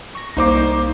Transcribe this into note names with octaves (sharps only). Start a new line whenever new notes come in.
C#6 A#6
C2 A#3 D#4 C5 D6